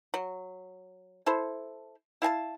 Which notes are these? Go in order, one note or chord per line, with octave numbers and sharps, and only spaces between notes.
F#3
E4 A4 C5
E4 F5 G#5 A5